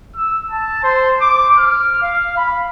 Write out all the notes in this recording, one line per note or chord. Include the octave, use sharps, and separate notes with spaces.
E6
A5
C5
D6
F6
F5
B5